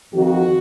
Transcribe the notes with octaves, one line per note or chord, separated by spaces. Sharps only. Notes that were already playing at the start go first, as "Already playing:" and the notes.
F2 D#3 F#4